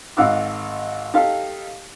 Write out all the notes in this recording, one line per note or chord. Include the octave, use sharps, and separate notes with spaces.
G#1 D#4 F5 F#5 D6 E6
D#4 G4 A4 F5